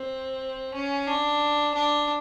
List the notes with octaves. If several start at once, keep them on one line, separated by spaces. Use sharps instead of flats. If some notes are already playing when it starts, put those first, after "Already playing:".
Already playing: C4
C#4
D4
D4